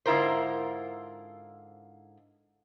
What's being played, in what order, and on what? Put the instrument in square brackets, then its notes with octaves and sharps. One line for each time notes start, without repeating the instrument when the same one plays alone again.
[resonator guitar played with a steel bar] G#2 D3 E4 F4 A#4 C5